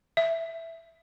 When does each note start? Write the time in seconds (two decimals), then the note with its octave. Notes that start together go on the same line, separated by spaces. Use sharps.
0.17 E5